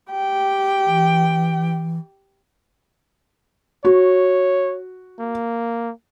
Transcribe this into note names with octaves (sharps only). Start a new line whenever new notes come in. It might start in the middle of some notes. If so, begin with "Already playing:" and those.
G4 G5
E3
F#4 C#5
A#3